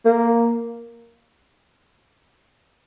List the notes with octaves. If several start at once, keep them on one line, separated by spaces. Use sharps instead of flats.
A#3